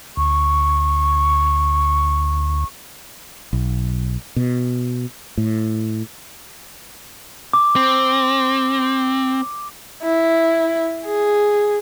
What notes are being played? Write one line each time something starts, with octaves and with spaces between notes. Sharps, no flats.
D2 C#6
B1
B2
A2
D6
C4
E4
G#4